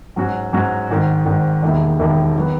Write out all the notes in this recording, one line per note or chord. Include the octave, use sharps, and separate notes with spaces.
G#2 F#3 C#4 F#4
G#2 F#3 C#4 F#4
G#1 G#2 D#3
G#1 G#2 D#3
E1 D#2 D#3 A#3 E4
E1 D#2 D#3 A#3 E4
D#3 F#3 B3